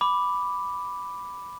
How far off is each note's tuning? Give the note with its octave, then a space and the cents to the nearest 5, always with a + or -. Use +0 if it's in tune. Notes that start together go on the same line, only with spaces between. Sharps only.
B5 +0 D6 +0